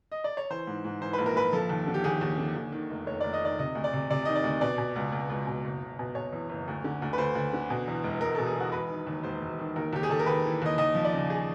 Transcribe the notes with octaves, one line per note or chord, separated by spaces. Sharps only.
D#5
D5
C#5
E3 C5
G#2
G#2
E3 C5
A#1 B4
A#4
A#1 B4
F3 A4
D#2
D3
G4
D#2 G#4
D#2
D3
D#2
D#3
F1
F1 C#5
F1 D5
D#5
D#3 D5
C3 D#5
D2
D5
C3
C3 D5
D#3 D#5
D5
D2
B2 D5
B2
C#2
C#2
C#2
B2
F#1
F#1
B2
B2 C#5
E2
F#1
D2
D3
D2
B4
D2 C5
D2
D3
B2
E2
E1
E1 A#4
B2 A4
G#4
E2
F#4
E1 B4
D#3
D#2
E1 C5
E1
D#3
D#2 A#4
D#2 G4
G#4
D#2 A4
A#4
D#2 B4
E3
D#2 D#5
D#2 D#5
F3
D5
C#3
G#4